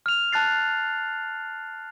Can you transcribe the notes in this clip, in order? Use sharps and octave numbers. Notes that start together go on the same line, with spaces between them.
F6 F7
A5 F#6 A6 C7